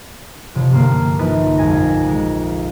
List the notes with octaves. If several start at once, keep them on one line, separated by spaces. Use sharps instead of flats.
F1 C3
G2 D3 A#3 F6 C7
A#1 D#4 B4 D#6 A6
F2 G#3 G#4 G#5 A#6
G#3